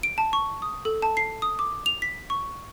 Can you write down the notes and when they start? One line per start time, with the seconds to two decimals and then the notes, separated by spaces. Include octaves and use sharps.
0.03 D7
0.18 A5
0.33 C#6
0.62 D#6
0.85 A4
1.02 A5
1.17 C7
1.42 D#6
1.59 D6
1.86 F7
2.02 B6
2.30 C#6